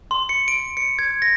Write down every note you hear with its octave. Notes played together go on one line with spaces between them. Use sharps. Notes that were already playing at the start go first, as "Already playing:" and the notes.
C6
C#7
D7
C#7
G#6
A#6